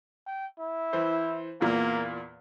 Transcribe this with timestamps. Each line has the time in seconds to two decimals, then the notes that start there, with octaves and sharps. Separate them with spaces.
0.27 G5
0.59 E4
0.93 E3 C5
1.61 E2 A#2 A#3